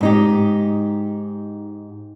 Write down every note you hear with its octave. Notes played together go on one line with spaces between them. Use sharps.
G#2 D#4 G4